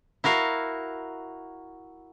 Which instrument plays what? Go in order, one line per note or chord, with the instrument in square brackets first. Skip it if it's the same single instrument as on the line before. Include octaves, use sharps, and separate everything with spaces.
[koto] E4 F#4 A#4 F5